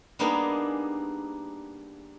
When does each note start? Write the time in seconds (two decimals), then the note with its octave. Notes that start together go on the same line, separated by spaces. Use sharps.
0.19 G3 A#3 B3 D4 D#4 G#4